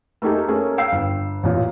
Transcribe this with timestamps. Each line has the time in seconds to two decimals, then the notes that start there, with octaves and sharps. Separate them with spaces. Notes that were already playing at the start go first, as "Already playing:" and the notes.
0.22 A3 A#3 D#4 G4 G#4
0.48 A3 A#3 C#4 G#4 A#4
0.78 F5 G5 E6 C7
0.92 G1
1.43 A1 A#2